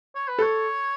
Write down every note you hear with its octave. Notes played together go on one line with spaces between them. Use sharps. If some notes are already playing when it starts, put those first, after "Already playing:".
C#5
B4
A4 C#5